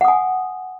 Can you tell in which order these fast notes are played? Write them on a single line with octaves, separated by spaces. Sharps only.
F#5 D#6 G#5